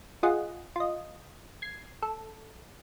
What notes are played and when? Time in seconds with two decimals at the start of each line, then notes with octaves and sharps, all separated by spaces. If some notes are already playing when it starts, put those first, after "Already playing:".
0.23 F4 G#4 D#5 F#5
0.76 F4 D#5
1.62 G#6 C7
2.02 A4